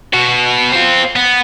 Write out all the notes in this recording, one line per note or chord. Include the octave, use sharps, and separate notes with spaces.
B2 F#4
C4 F4
B3